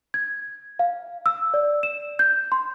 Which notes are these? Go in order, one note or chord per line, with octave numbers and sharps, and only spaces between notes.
G#6
F5
E6
D5
E7
G6
C6